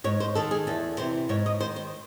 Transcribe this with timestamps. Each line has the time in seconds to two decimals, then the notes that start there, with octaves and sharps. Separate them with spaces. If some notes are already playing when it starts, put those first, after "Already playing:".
0.04 G#2 C#5
0.20 C5
0.35 D#3 A4
0.51 G#4
0.67 E2 A4
0.98 C3 E3 C5
1.29 G#2 C#5
1.46 D#5
1.60 D#3 C5
1.76 C5